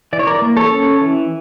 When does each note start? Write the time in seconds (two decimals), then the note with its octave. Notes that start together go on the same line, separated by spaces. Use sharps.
0.13 E3 D5
0.19 C#5
0.27 A#4 D5
0.42 A#3
0.57 A4 C#5
0.71 C#4
1.01 E3